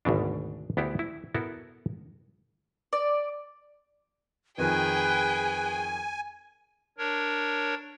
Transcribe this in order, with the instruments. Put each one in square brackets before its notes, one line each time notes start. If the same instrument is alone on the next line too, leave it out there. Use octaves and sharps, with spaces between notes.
[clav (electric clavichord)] G#1 D2 B2 D4
D2 B3 E4 G4 C5
E4
B3 E4 F#4 A4 A#4
[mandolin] D5
[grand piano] F2 D#3 F3 [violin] G#4 G5 [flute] B4 [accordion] G#5
[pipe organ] D4 A#4 C#5